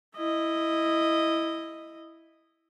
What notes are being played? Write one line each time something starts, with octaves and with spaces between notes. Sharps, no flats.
E4 D#5